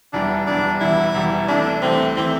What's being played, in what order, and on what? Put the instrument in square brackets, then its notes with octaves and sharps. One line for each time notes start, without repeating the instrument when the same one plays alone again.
[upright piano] E1 E2 E3 G3 [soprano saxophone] D4
[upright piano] E1 E2 E3 G3 [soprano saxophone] D4
[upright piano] E1 E2 E3 G3 [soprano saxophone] E4
[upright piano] E1 E2 E3 G3
[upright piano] C2 C3 E3 A3 [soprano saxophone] D4
[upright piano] C2 C3 E3 A3 [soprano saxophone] C4
[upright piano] C3 E3 A3 [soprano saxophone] C4